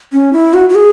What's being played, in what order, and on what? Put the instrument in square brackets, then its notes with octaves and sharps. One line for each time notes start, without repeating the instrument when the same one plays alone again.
[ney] C#4
E4
F#4
F#4
G#4